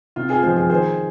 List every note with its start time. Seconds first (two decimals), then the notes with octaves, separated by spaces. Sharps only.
0.16 C3 F4
0.29 F4 G#4
0.43 F3 G#3 G#4 C5
0.57 F4 G#4
0.69 D#3 G#4 C5